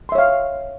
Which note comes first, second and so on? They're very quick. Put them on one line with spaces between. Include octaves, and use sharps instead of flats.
C6 E5 C#5 F5